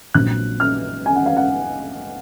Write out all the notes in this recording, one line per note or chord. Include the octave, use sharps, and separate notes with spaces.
A#1 A#2 F#3 C4 F#6
F6
G#5
F#5
F5
F#5